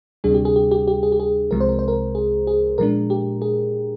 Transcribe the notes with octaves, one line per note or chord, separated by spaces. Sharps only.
D2 C3 G3 D4 G#4
G4
G#4
G4
G4
G4
G#4
G4
G#4
C2 C3 F3 G#3 A#4
C5
A#4
C5
A#4
G#4
G#4
A#2 F3 G#3 D4 A#4
G4
G#4